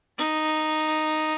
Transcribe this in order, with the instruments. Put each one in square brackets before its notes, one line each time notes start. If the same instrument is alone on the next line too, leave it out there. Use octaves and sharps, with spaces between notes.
[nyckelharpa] D#4